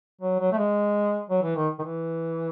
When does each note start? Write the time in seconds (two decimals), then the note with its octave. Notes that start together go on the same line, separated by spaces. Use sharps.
0.21 F#3
0.40 F#3
0.52 A3
0.58 G#3
1.29 F#3
1.43 E3
1.56 D#3
1.79 D#3
1.83 E3